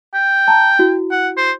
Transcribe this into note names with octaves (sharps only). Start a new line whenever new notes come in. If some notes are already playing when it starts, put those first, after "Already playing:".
G5
A5 A#5
E4 F#4
F#5
C5